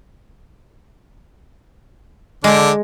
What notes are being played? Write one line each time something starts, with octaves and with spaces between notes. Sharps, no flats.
D3 G#3 D4